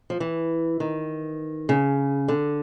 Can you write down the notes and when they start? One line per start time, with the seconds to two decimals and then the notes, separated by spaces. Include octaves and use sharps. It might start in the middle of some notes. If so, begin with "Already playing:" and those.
0.10 F3
0.20 E3
0.80 D#3
1.69 C#3
2.28 D3